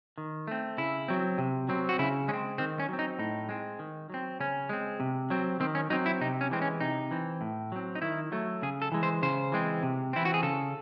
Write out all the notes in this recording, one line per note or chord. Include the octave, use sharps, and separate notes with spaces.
D#3
A3 C4
C#3 E4
F#3 C4
C3
F#3 C4
F#4
C#3 E4
G#3 C#4
C4
D#3 C4
C#4
F#3 C4
D#4
A2 D#4
G#3 C4
D#3
F#3 C4
C#3 C#4
G#3 C4
C3
F#3 C4
D#3 C4
C#4
F#3 C4 D#4
E4
C3 D#4
C#4
E3 G#3 C4
C#4
C3 D#4
E3 C4
A2
F#3 C4
D#4
D#3 E4
F#3 A3
C#3 G#4
A4
E3 G#3
C5
C#3 C5
E3 G#3 C4
C3
E3 C4 E4
F#4
G#4
C#3 A4